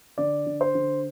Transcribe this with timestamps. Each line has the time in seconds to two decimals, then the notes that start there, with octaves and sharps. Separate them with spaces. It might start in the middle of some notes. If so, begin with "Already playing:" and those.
0.18 D3 D5
0.47 D3
0.61 C5
0.75 D3